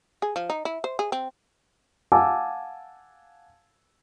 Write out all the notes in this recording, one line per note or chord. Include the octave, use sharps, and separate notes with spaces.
G#4
F3
D#4
E4
C5
G#4
C4
F5 F#5 G#5 A5 D6 E6